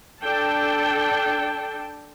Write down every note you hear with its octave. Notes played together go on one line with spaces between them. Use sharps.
D4 A4 G5 A5